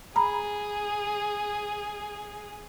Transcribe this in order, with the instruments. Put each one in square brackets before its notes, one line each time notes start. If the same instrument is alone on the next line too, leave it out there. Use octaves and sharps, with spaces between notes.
[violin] G#4 [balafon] A#5 B5